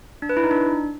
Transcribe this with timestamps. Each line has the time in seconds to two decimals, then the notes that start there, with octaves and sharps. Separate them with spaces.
0.22 D4
0.29 B4
0.37 E4
0.44 D#4
0.51 D4